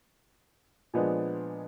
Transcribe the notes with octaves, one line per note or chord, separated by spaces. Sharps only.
A#2 F3 G#3 B3 D4